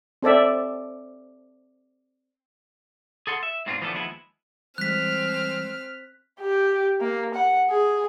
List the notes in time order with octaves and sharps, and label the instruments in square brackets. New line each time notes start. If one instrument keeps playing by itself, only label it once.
[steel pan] C4 A4 D5 E5
[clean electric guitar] G#4 A4 F#5 C6
E5
G#2 B2 C4 D4 D#4 F4
E3 F3 A3 B3 D4 A4
D#2 F3 G#3 B3 E4
[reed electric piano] E3 G3 G#3 [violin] C4 F6 [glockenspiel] F#6 B6
[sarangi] G4
A#3
F#5
G#4